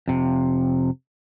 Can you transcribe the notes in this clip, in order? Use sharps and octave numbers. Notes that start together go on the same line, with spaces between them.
F2 C3